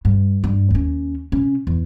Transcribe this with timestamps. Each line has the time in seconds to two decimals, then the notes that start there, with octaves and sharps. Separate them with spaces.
0.05 G2
0.44 G2
0.71 D#2 C#4
1.32 C3 C#4
1.67 E2